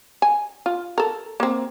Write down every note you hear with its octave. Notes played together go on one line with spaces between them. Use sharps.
G#5
F4
A4 A#4
A#3 C4